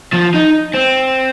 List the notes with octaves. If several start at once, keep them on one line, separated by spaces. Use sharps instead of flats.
F3
D#4
C4